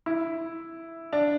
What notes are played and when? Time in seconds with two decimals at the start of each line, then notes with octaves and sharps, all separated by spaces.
0.06 E4
1.13 D4